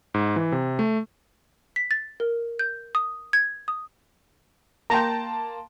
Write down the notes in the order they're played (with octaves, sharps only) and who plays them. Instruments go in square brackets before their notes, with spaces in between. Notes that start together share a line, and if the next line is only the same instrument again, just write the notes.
[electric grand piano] G#2
E3
C3
A3
[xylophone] B6
A6
A#4
G6
D#6
G#6
D#6
[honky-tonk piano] A#3 A5 C6 [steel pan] G5 A#5